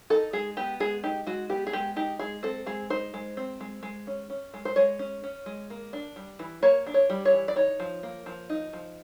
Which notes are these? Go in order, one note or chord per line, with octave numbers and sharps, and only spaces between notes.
D#4 A4
G#3 G#4
B3 G4
G#3 G#4
D#4 G4
G#3 F#4
B3 G4
G#4
G#3 G4
D#4 G4
G#3 G#4
C4 A4
G#3 G#4
D#4 C5
G#3
C4
G#3
G#3
C#4
C#4
G#3
C5
G#3 C#5
C#4
C#4
G#3
A#3
D4
G3
E3
A#3 C#5
D4
C#5
G3
C#5
E3
D5
D#4 C#5
F3
A#3
F3
D#4
F3